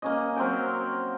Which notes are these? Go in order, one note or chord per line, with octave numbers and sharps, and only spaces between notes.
A#3 C#4 D#5
F#3 C4 A#4 G5